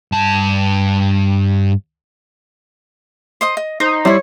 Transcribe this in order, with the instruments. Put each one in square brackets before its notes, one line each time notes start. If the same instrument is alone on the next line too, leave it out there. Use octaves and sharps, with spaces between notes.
[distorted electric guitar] G2 A5
[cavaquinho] C5 D#5 D#6
D#5
[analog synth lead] D#4 [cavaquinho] C5
[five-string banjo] G3 E4 [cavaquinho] C5 B5 [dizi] C#5